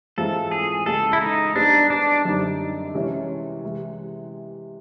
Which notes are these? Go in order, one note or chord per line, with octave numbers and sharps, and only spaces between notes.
G#2 E3 G#3 C4 F4 A4
G#4
C#2 C#3 E3 G#3 A4
E4
D#4
G3 B3 D4 D#4 G#4 C5
D4
F#2 D3 G3 C4 D#4
C3 E3 G#3 C#4
C3 E3 G#3